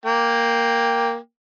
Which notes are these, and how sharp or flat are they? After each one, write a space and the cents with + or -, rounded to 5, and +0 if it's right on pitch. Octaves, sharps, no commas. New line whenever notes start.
A#3 +0 G5 +10